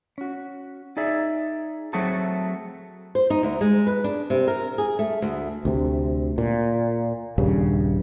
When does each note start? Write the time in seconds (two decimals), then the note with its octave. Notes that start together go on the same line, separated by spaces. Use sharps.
0.18 C#4 F#4
0.97 D#4 G#4 D5 E5
1.93 F#3 A3 C4 F#4 G#4 A4
3.15 C5
3.30 D#4
3.43 D2
3.61 G#3
3.87 B4
4.04 D4
4.30 C3
4.47 A#4
4.78 G#4
4.99 A3
5.22 D2
5.65 D2 C3
6.38 A#2
7.38 D#1 G2 C#3